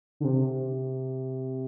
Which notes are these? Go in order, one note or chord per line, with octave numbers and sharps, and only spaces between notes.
D3
C3